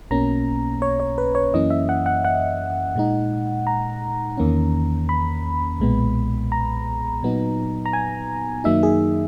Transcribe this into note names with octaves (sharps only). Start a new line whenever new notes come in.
B1 B2 A#3 C#4 A#5
C#5
C#5
B4
C#5
F#2 E3 A#3 C#4 D#5
E5
F#5
F#5
F#5
A#2 G#3 D#4
A#5
E2 D#3 A#3 C#4
B5
B1 A#2 G#3 B3
A#5
A#2 F#3 B3 D#4
A#5
G#5
F#2 D#3 F#3 A#3 D#4 E5
G#4